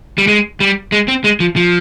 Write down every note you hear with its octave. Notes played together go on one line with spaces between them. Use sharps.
G3
G#3
G3
G#3
C4
G#3
F3
F3